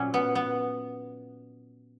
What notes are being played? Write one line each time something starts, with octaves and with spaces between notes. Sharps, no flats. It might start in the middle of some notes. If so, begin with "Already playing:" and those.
Already playing: A#2 F#3 C#4
B3
B3